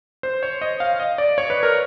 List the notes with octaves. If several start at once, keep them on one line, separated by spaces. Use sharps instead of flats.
C5
C#5
D#5
F5
D#5
D5
C#5
B4
A#4